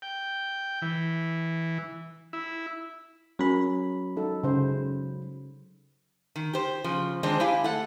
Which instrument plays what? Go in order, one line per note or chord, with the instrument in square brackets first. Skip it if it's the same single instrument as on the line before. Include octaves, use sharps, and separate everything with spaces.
[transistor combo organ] G5
E3
E4
[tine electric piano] F#3 B5 [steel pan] C#4 A#4
[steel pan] D#4 A4
C#3 C5
[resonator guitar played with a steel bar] D#3
G4 C5
C#3 F3
D#3 G#3 C4 D4 C5
E4 G4 F5 G#5
A3 F#5